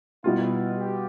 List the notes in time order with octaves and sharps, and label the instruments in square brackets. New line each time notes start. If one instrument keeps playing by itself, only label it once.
[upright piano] B2 G3 B3 F4 [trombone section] E4
[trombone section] G4